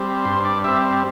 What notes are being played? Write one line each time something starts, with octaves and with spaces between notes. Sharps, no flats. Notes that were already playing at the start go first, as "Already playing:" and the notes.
Already playing: G3 C4
G2 C5
D5
G3 C4 E5